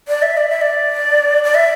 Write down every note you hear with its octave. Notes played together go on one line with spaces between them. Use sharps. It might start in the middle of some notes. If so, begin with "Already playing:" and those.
D5
E5
D5
E5
D5
D5
E5